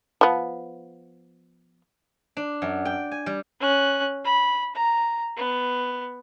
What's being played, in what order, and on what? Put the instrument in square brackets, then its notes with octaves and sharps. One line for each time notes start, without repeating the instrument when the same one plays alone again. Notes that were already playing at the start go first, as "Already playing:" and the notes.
[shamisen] F3 B3
[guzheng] D4
F#2
G5
G#5
G3
[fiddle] C#4 F#6
B5
A#5
B3